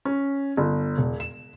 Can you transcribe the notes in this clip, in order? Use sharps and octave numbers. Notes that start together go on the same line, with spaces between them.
C#4
G1
E1
E7